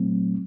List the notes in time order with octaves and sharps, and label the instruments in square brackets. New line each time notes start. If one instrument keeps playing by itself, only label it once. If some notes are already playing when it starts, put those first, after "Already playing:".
Already playing: [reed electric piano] A#2 F#3 A3 C4